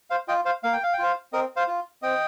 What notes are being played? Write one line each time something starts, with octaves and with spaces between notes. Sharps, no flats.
C5 F5
F4 D#5 G5
C5 F5
A#3 F5
G5
F5
G5
F4 C5 F5
C4 A#4 D#5
C5 F5
F4
C4 D#5 G5